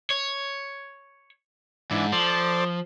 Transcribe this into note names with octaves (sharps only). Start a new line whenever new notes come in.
C#5
G#2 E3 D4
F3 A4 C5 D5